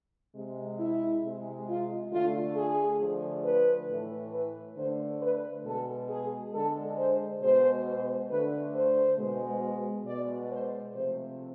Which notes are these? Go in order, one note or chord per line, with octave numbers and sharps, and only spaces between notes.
C3 G#3
E4
C3 G#3
F4
D3 A3 F4
G#4
D3 F3 A3
B4
A2 E3 A3
B4
D3 A3 C5
B4
B2 G#3 A4
G#4
D3 G#3 A4
C5
B2 G#3 C5
D3 A3 B4
C5
B2 G#3
B2 G#3 D5
C5
C3 F3 A3 C5